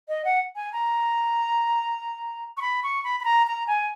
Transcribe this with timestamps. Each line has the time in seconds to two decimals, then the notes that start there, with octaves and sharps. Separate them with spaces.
0.08 D#5
0.24 F#5
0.55 G#5
0.72 A#5
2.57 C#6
2.61 B5
2.83 C#6
3.04 B5
3.20 B5
3.24 A#5
3.47 A#5
3.67 G#5